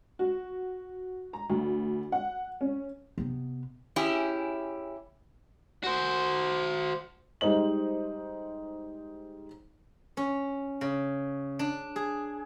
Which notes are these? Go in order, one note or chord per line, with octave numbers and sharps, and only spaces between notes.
F#4
A#5
D2
F#5
C#4
C3 B3
C#4 E4 G4 G#4
F#4 C5
G3 G#3 D#4 C5 D#5 F#7
C#4
C#3
D4
G#4